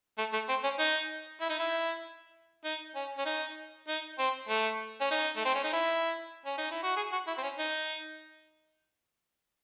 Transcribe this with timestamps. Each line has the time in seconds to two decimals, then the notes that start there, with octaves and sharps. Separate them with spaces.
0.18 A3
0.33 A3
0.49 C4
0.64 C#4
0.79 D#4
1.41 E4
1.50 D#4
1.59 E4
2.65 D#4
2.95 C#4
3.18 C#4
3.26 D#4
3.88 D#4
4.19 C4
4.49 A3
5.01 C#4
5.11 D#4
5.37 A3
5.45 C4
5.55 C#4
5.64 D#4
5.73 E4
6.46 C#4
6.58 D#4
6.71 E4
6.83 F#4
6.96 G#4
7.12 F#4
7.27 E4
7.38 C4
7.43 C#4
7.59 D#4